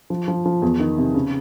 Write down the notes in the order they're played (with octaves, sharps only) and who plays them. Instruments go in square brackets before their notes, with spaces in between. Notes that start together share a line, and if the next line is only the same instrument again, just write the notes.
[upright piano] F3
F3
F3
E2
D#3
C3
C#3